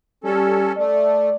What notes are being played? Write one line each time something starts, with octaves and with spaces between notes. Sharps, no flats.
G3 C#4 A4
A3 D5